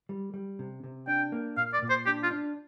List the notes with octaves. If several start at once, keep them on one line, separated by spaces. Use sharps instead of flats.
G3
G3
C3
C3
D4 G5
A#3
A#2 F5
D5
A#2
C5
D4 G4
F4
D4